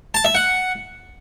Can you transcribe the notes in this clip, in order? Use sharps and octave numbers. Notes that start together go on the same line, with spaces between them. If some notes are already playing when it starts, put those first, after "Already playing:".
A5
E5
F#5